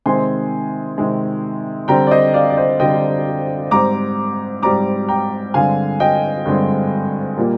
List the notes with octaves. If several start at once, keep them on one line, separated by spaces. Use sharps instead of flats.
C3 D#3 G#3 C4 G#5 C6
C3 D#3 G#3 C4
D3 G3 C4 G5 A#5
D5
C5 D#5
D5 F5
D5
C5 D#5
D3 G3 C4 D#5 G5
G#2 G3 C4 A#5 D6
G#2 G3 C4 A#5 D6
G5 A#5
G2 D3 G#3 C4 F5 G#5
D#5 G5
G2 D3 G#3 C4
A#2 G3 A#3